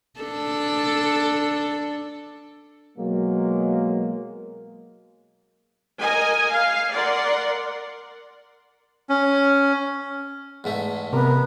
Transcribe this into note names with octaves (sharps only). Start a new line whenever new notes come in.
D4 A4
B2 F#3 G#3 A#3
A#4 D#5 G#5
F5
A#4 D5 F#5 C6
C#4
E2 G#2 A3
C3 B3 A#4